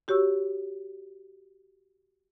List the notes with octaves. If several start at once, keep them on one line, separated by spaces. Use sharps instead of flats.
F#4 G4 C#5 C#6 E6